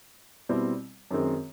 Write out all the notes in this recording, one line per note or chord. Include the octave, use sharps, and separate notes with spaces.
B2 G3 C4 E4
F#2 D#3 G#3 C4